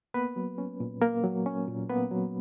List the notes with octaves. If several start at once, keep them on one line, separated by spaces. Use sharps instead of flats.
A#3 B3 B4
F#3
C#4
A#2
A#3 A#4
F#3
C#4
A#2
A#3 B3 B4
F#3